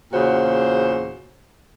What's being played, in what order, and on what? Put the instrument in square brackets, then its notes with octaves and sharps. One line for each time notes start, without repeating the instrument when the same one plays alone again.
[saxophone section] E2 A#2 C#3 F#4 C5